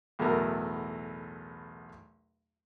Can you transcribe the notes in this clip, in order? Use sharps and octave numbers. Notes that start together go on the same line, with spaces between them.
B1 E2 A2 F#3 A3 A#4